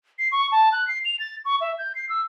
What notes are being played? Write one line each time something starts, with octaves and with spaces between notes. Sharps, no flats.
C7
C#6
A5
F#6
C7
F7
A6
C#6
E5
G6
C7
E6